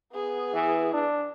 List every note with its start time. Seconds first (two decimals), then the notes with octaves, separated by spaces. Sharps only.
0.13 B3 G#4
0.54 E3
0.94 D4